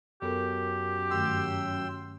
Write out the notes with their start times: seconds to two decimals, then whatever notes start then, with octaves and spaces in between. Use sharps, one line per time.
0.22 F#2 B3 G4 A4 A#4
1.11 G2 D#3 A3 G5 C6 E6